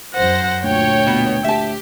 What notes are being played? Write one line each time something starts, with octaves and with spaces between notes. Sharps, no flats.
F#2 C5 F#5 A#6
D2 A#2 C#5 G5
B2 B3
D2 G4 E5 A5